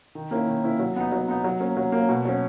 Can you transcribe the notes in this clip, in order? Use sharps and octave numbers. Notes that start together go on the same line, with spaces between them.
D#3
A#3 C#4 E4
D#3
A#3 C#4 E4
F#3
B3 D#4
F#3
B3 D#4
F#3
A#3 C#4
F#3
A#3 C#4
B2
F#3 C#4